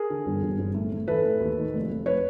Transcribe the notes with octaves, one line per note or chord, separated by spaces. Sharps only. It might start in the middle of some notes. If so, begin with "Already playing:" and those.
Already playing: G#4 A#4
D3
G1
G1
G1
A2
A2
E3 A4 B4
A2
D#2
D#3
F1
F1
B4 C#5